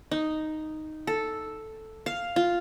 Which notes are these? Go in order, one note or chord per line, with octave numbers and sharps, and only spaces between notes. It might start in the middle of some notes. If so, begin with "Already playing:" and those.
D#4
A4
F5
F4